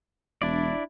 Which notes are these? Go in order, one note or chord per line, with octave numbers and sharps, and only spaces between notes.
E1 D4 E4 D5